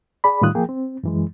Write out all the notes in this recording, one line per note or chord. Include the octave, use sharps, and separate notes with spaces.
G#4 D5 B5
A2 D#3 G3 F4 D#6 F#6
F3 A#3 G#4 G5
C4
F#2 E3 G#3